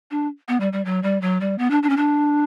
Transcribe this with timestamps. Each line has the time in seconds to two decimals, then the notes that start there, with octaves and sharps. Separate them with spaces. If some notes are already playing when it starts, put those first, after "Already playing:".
0.11 D4
0.48 B3
0.60 G3
0.73 G3
0.85 F#3
1.03 G3
1.22 F#3
1.41 G3
1.58 B3
1.70 D4
1.83 D4
1.90 C#4
1.97 D4